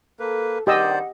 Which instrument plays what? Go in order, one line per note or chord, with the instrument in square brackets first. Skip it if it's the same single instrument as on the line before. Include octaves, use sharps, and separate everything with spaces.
[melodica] A#3 B4 [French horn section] A4
[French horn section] G2 D#3 [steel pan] G4 D#5 E6 [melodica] C5 D5 [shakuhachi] F#5